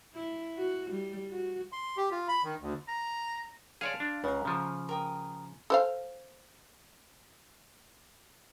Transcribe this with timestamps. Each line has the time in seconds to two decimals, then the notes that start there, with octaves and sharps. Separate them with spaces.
0.15 E4
0.58 F#4
0.91 G3
1.31 F#4
1.72 C6
1.97 G4
2.11 F4
2.28 B5
2.44 D#3
2.60 D2
2.88 A#5
3.81 G#4 C#5 D5 F5 A5 C6
4.00 D4
4.24 C#2 C#3 F#5 A#5
4.45 C#3 F3
4.89 A#4 G5 D#6
5.70 A4 C5 F5